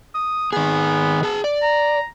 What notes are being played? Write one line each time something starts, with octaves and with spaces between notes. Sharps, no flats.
D#6
D#3 B3 G#4
G#4 A5
D5
A#5